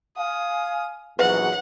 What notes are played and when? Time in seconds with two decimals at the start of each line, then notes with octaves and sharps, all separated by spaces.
0.17 F5 G#5 D#6
1.19 A#1 E2 F#3 B4 E5 F#5